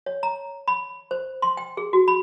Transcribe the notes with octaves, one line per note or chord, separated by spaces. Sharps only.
C#5
A#5
B5
C5
C6
G5
G#4
F#4
B5